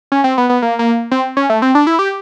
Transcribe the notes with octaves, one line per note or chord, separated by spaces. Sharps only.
C#4
C4
B3
B3
A#3
A#3
C4
C#4
A3
C4
D4
E4
G4